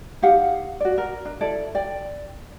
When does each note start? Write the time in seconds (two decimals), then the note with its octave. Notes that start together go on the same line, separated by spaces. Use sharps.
0.22 D#4 G4 F5 F#5
0.80 F#4 D5
0.98 A#4
1.25 D4
1.41 E4 A4 D5
1.75 D5 G5